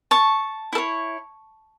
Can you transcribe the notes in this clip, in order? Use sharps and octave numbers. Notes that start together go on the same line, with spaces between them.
A5 C#6
E4 A4
C#5